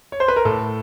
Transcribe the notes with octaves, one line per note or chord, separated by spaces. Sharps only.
C#5
C5
B4
A#4
A2 A4